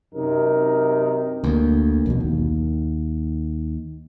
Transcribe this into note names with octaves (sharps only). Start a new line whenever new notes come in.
F#2 C3 D#4 A#4
D2 A#3
B1 F2 B2
D#2